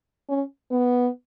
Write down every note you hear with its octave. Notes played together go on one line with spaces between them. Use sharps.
C#4
B3